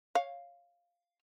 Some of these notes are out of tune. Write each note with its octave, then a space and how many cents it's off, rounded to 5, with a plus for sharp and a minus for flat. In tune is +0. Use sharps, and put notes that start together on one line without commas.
C#5 -5 F5 +0